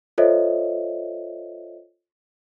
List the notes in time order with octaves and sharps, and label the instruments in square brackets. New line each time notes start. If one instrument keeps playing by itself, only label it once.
[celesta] F4 A4 C5 C#5 D#5 E5